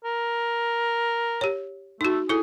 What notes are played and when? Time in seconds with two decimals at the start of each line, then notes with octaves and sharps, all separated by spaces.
0.05 A#4
1.41 G4 C#5
2.01 A3 D#4 F#4
2.29 E4 G#4 A4